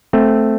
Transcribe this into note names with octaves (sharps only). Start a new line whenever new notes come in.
A3 C4